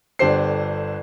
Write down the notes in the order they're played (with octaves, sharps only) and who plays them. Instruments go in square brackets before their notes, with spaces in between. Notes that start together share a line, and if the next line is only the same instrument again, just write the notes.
[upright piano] G1 D3 D4 G4 C5 C7